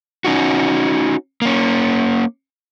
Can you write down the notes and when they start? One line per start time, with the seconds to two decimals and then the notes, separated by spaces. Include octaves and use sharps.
0.24 C#4 D#4 F#4
1.42 A#3 C#4